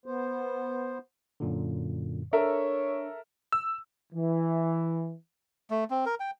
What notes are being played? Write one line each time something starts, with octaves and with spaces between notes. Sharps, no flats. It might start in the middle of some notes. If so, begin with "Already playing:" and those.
B3 C5
F#2 A#2 D3
D4 A4 A#4 C#5 E5
E6
E3
A3
C4
A#4
G5